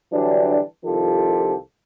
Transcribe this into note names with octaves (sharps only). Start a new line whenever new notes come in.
D3 E3 F#3 G3 D4
C2 D#3 F3 F4 G4 A4